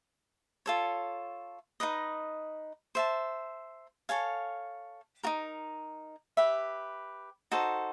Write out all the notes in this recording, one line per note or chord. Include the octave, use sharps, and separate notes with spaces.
F4 A4 C#5
D#4 F#4 B4 D#5
C5 E5 A5
A4 C#5 F5 G#5
D#4 F#4 A#4
G4 B4 E5
D#4 F#4 A4 C5